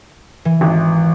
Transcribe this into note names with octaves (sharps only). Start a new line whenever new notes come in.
E3
G#1